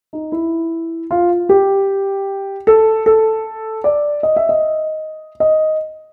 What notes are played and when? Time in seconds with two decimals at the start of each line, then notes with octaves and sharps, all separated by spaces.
0.13 D#4
0.32 E4
1.11 F4
1.49 G4
2.67 A4
3.06 A4
3.84 D5
4.23 D#5
4.36 E5
4.49 D#5
5.40 D#5